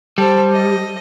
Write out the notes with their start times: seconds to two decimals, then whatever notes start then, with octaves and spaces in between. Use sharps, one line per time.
0.18 G3 A4 C5
0.52 D#5